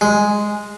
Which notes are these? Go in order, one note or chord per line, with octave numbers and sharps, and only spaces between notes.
G#3